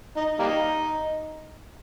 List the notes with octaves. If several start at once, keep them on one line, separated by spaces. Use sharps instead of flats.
D#4
G3 A#3 D#4